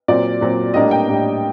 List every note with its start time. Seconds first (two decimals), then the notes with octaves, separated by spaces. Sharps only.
0.08 A#2 F#3 C4 D5
0.41 A#2 F#3 C4
0.74 A2 G3 A#3 D4 D#5
0.91 G5
1.08 A2 G3 A#3 D4